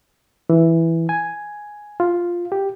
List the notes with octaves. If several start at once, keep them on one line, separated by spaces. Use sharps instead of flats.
E3
G#5
F4
G4